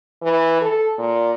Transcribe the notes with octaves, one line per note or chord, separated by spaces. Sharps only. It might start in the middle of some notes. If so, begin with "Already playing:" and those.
E3
A4
A#2